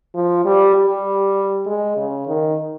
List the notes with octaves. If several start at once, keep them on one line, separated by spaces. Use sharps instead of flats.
F3
G3
G3
G#3
C#3
D#3